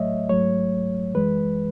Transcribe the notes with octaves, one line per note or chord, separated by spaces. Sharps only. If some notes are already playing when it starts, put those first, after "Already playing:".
Already playing: A2 F#3 A3 C#5 D#5 E5
G#2 F#3 A3 C#5
F#2 E3 G#3 B4